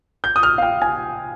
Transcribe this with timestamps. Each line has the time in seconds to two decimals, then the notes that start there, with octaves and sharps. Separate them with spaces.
0.24 G6
0.36 D#6
0.43 F6
0.58 F5
0.62 G5
0.82 G#5